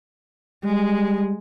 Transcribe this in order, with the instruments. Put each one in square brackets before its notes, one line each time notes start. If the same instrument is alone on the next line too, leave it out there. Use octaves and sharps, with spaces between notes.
[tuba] G3 [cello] G#3